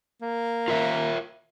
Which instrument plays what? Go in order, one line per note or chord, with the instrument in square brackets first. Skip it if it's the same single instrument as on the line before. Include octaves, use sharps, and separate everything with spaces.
[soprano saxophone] A#3
[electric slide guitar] F4 A#4 E5